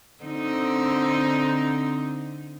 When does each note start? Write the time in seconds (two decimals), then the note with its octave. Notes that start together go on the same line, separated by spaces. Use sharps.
0.24 D3 C4 D#4